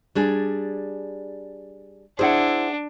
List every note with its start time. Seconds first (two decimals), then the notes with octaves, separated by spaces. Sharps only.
0.15 G3 D4 G#4
2.19 D4 E4 G#4 C5 F#5